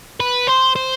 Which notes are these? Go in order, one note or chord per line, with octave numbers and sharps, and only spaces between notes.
B4
C5
C5